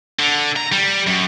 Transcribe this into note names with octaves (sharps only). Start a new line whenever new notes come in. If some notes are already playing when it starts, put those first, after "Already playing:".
D3
A#5
G3
F#2